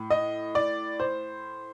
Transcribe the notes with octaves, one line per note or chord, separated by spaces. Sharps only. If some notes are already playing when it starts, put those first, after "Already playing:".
Already playing: A2
D#5
D5
C5